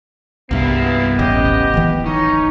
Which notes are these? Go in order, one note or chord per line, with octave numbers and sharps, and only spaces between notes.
C2 G2 A#3 B3 E4
D#1 A1 C#3 G4 D#5
D1 G#1 E3
C#4 D#4